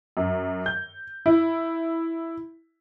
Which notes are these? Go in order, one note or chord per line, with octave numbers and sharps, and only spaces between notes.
F#2
G6
E4